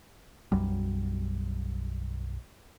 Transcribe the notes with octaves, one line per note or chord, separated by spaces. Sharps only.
B1 F#2 F#3 G3